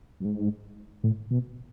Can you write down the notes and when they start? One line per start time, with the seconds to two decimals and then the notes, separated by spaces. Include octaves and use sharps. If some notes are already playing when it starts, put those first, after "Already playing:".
0.20 F#2
0.25 G#2
1.03 A2
1.31 B2